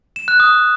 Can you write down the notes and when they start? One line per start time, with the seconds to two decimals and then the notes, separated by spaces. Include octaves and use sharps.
0.16 E7
0.28 F#6
0.40 D#6